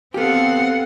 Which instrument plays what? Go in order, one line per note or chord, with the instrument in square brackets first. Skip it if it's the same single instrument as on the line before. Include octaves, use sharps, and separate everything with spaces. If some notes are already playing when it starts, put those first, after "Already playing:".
[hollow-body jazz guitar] B3 G4 [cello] C4 F#5 [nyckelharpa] A4 F5